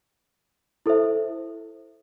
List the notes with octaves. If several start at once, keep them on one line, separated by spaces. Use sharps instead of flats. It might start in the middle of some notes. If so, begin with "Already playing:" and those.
E4 A4 C5 E5